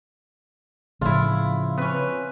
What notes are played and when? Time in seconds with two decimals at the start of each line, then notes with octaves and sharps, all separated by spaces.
1.01 A2 C#3 F3 E4 F4
1.78 C4 C#4 B4